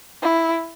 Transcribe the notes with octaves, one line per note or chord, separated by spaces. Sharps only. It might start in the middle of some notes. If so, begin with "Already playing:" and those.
E4